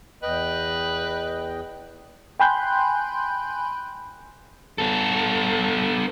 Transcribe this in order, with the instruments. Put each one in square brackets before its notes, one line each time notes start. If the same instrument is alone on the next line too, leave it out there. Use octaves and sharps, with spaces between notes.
[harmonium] E2 D#5 G5 [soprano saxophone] B4
[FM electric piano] G5 G#5 B5 C6 F#6 G6
[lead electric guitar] B3 A4